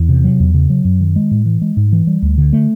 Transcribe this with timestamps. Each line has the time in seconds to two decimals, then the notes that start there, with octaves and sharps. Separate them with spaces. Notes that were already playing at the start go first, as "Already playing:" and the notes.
Already playing: E2
0.09 C3
0.24 F#3
0.40 E2
0.54 C#3
0.70 F#3
0.85 F#2
1.00 D#3
1.16 G#3
1.31 A2
1.46 E3
1.62 G#3
1.77 G#2
1.93 E3
2.07 G3
2.22 D2
2.38 D3
2.53 A3